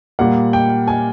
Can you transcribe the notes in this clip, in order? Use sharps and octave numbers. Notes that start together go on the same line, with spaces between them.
A#2 G3 A#3 F#5
G5
G#5